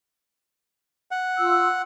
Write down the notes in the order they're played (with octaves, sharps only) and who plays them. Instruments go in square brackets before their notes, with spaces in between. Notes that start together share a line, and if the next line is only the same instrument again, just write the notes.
[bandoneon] F#5
[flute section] F4 E6